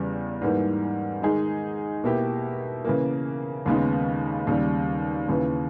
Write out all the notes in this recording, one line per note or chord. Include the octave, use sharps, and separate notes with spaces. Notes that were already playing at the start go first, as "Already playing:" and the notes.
Already playing: E2 C#3 G3
G#2 E3 G3 A#3
D#3 G#3 D#4 G#4
B2 A#3 E4 G4
C#3 E3 A#3
D#2 C#3 G#3 B3 D#4
D#2 C#3 G3
D#2 C#3 E3